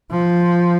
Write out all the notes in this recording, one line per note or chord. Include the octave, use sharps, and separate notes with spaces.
F3